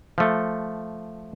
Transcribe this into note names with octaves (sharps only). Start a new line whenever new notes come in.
F3 A3